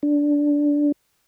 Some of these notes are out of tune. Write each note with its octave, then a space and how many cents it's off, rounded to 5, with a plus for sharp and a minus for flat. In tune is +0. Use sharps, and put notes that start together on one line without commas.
D4 -10